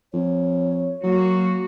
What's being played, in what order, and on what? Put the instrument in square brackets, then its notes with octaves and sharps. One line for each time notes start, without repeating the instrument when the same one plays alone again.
[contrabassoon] F2 [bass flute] C#5
[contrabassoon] F#3 [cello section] A#3 F#4